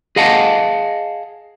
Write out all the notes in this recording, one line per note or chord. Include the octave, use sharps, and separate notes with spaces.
G#4 D#5 F5 F#5 A5